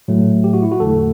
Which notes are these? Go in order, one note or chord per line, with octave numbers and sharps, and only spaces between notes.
A2 F#3 A3
G4
F#4
E4
F#4
E2 D3 A3 A4